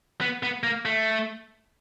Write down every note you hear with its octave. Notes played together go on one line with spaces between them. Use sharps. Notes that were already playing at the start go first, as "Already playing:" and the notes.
B3
B3
A#3
A3